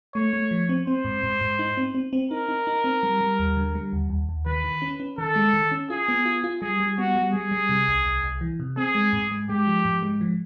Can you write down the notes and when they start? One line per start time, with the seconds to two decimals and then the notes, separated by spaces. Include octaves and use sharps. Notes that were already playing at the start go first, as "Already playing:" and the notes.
0.15 A3 C#5
0.33 A3
0.51 F3
0.69 C4
0.87 C4 C5
1.05 G#2
1.23 G#2
1.41 G#2
1.59 D#4
1.77 C4
1.94 C4
2.13 C4
2.31 D#4 A#4
2.49 D#4
2.67 D#4
2.84 C4
3.03 G3
3.21 G3
3.39 D#2
3.57 D3
3.75 G3
3.93 D#2
4.10 D#2
4.29 D#2
4.46 D#3 B4
4.64 D#3
4.82 C#4
5.00 C#4
5.18 D#3 A4
5.36 G#3
5.54 D#3
5.72 C#4
5.90 F4 G#4
6.08 B3
6.26 F4
6.44 F4
6.61 G3 G#4
6.80 G3
6.98 B3 F#4
7.15 G3
7.33 G3 G#4
7.52 G3
7.69 C3
7.88 C2
8.05 C2
8.24 C2
8.41 E3
8.60 C3
8.77 C4 G#4
8.95 G#3
9.13 G#2
9.31 G#3
9.49 G#3 G4
9.67 F3
9.85 G#2
10.03 G#3
10.21 F3